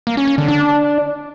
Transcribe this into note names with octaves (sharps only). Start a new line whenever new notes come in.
A#3
C#4
C#4
D3
D4